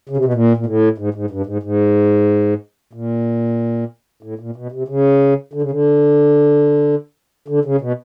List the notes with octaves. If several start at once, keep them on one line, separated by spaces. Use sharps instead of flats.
C#3
C3
B2
A#2
A#2
A2
G#2
G#2
G2
G#2
G#2
A#2
A2
A#2
B2
C3
C#3
D3
C#3
D3
D3
C#3
B2